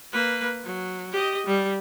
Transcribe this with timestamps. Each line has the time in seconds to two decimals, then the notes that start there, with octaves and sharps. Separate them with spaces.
0.12 A#3 B4
0.64 F#3
1.12 G4 D#5
1.47 G3